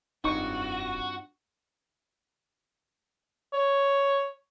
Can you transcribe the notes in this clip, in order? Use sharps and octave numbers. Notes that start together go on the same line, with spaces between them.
F1 G2 C4 D#4 F4 F#4 C#6
C#5